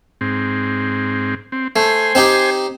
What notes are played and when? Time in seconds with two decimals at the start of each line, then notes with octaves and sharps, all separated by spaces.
0.21 G#2 C4
1.52 C4
1.76 A3 C5 G#5
2.15 C4 D#4 G4